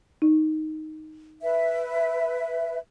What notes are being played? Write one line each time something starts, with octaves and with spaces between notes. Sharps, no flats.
D#4
B4 E5